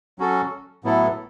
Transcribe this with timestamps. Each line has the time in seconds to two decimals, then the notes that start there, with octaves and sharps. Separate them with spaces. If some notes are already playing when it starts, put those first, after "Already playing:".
0.19 F#3 C#4 F#4 A4
0.84 A2 F#3 B3 E4 A4